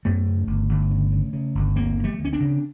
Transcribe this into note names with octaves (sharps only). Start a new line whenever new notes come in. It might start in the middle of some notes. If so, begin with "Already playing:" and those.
F#2 A3 B3
C#3
G1
G1
C#3
C#3
C#3
G1
D2 A#3 C4
D2
G3 A3
D2
C#4
C4 D4
C#3